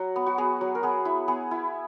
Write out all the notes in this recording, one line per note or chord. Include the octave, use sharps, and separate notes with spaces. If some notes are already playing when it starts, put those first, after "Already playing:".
Already playing: F#3 F#4
B3
F#4
B3 G#4
F#3
A#4
B3 G#4
E4
B3 G#4
E4